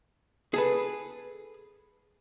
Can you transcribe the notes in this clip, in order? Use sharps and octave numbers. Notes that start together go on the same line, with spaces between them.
G#4 A4 B4